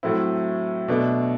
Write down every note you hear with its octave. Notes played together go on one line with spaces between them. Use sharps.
A2 F#3 A3 C4 E4
B2 A3 D4